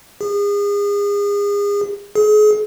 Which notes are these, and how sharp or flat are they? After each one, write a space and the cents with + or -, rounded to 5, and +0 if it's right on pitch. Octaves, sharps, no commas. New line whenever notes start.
G#4 -35
G#4 +35